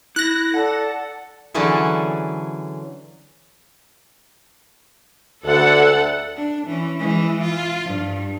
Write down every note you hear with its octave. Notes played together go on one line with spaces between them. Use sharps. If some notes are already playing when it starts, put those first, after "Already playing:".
E4 F#6 A#6
A4 D5 F#5 A5
D3 E3 F#3 C#4 G#4 A4
D2 A4 F#5
D4
E3 C#4
E3 G#3
F4
G2